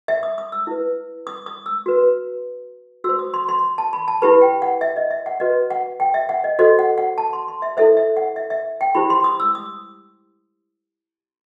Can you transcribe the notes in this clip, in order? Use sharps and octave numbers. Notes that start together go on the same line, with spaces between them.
E5
D#6
D#6
E6
E4 B4
D#6
D#6
E6
F#4 B4
F#4 C5 E6
D#6
C6
C6
A5
B5
A5
E4 G4 B4 B5
G5
F#5
E5
D#5
E5
F#5
F#4 B4 D#5
F#5
G5
E5
F#5
D#5
F#4 A4 C5 D#5
F#5
F#5
A5
C6
C6
E5
E4 A4 C5 E5
E5
F#5
E5
E5
G5
E4 G4 C5 B5
C6
D#6
E6
D#6